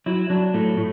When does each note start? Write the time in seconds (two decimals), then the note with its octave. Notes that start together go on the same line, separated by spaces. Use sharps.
0.06 F#3 E4
0.30 F#3 D4
0.54 A2 A3
0.77 A2